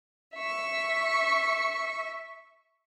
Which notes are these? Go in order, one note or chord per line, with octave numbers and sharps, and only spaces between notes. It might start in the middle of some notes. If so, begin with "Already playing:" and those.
E5 C#6